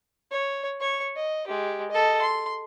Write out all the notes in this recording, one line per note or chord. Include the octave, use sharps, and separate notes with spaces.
C#5
C#5 C#6
D#5
G#3 G4
A4 D#5
C6